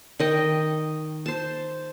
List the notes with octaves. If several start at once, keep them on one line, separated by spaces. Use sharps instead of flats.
D#3 D#5 G5
C5 A5